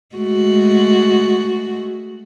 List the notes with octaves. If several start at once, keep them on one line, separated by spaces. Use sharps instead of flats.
G#3 A3 F#4